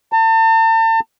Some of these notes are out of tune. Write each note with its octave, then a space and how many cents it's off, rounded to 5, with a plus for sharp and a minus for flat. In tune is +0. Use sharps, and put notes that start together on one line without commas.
A5 +40